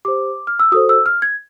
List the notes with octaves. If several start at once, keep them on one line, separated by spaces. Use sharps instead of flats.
G4 C5 D6
F6
E6
F#4 A4 C5 D#6
E6
F6
G#6